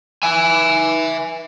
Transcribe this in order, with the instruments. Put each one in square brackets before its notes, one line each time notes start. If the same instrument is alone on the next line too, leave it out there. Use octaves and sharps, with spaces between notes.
[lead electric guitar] E5 G#5